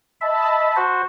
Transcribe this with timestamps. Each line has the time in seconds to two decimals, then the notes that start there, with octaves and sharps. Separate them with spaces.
0.21 D#5 E5 A5 B5
0.76 F#4 C5